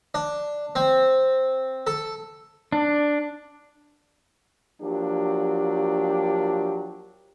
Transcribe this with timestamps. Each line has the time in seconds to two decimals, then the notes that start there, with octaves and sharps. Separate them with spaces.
0.14 D4
0.76 C4
1.87 A4
2.72 D4
4.81 F3 F#3 A#3 D4 G4